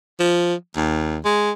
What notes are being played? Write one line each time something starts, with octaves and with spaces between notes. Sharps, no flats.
F3
D#2
G#3